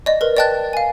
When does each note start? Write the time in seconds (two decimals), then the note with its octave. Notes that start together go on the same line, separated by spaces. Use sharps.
0.06 D5 D#5
0.21 A#4 B4
0.37 D5 D#5 G5 A5 F#6 A6
0.73 F5 G#5